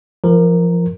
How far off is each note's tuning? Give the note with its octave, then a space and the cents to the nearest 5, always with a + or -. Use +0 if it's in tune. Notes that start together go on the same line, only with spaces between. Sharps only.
F3 -20 A#4 +0